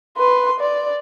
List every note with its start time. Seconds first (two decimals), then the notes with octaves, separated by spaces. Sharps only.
0.17 B4 C6
0.60 D5